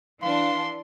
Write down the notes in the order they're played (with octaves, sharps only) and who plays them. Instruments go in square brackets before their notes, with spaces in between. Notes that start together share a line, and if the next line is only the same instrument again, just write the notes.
[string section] E3 D4 [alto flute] F5 [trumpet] C6